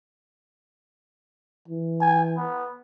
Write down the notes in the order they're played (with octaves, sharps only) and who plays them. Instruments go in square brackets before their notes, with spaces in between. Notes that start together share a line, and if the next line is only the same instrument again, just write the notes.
[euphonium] E3
[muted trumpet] G#5
B3